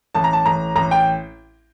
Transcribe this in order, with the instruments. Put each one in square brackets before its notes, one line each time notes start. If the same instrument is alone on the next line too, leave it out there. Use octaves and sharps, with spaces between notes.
[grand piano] A1 A5
A#5
A5
A1 A#5
A1 A#5
G5